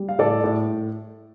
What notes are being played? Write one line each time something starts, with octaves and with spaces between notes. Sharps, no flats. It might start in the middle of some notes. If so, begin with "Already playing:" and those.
Already playing: G3
F5
A2 A4 D5
A2